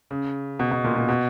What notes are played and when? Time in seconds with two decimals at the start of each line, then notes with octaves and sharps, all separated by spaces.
0.11 C#3
0.59 B2
0.71 B2
0.84 A#2
0.96 A#2
1.09 B2